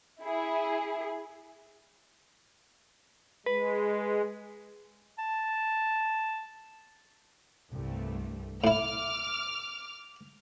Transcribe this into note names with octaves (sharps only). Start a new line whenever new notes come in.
E4 G#4
G#3 B4
A5
C2 G2 A3
A2 E4 D6 F6